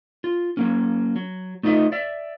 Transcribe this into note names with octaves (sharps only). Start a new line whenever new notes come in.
F4
F#3 A#3 C#4
F#3
A3 D#4 F4 D#5 E5
D5 E5